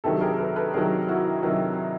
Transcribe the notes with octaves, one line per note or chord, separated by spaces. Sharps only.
C3 D#3 F#3 G4 A4
G#4 A#4
A4 B4
A4 B4
C3 D#3 F#3 G#4 A#4
E4 F#4
C3 D#3 F#3